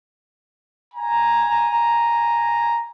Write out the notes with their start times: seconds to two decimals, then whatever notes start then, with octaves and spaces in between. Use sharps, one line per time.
0.94 G#5 A#5